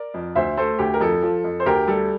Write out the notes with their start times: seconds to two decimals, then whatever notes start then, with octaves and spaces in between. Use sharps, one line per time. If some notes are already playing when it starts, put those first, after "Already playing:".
Already playing: A#4 D5
0.14 F2
0.35 D2 C5 E5
0.57 A3 A4 C5
0.79 D2 G4
0.94 A#4
1.00 F2 A4
1.22 F3
1.44 F2
1.60 C5
1.66 D2 G4 A#4
1.88 G3 A4